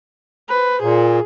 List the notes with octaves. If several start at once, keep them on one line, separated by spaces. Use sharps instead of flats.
B4 C5
A#2 G#4